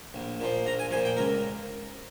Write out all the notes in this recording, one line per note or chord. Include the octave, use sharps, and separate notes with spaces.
A#1
A#2 F3
A#1 A#5
G#5
A#2 F3 G#5
G5
C#2 A#4